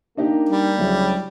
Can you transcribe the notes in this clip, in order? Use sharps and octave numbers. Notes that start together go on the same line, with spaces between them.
A#3 D4 D#4 G4
G3
D2 C#3 F#3 E4